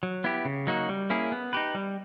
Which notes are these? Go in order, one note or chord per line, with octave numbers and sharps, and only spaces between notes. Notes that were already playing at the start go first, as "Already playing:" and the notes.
F#3
B3 E4 G4
C#3
F#3 A#3 D#4 F#4
G3
A#3 C#4 E4 G#4
B3
D#4 G4 B4
G3